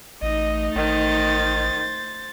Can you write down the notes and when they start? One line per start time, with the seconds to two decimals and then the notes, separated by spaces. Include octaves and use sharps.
0.22 A1 A3 D#4 D#5
0.75 A1 D#3 C5 A6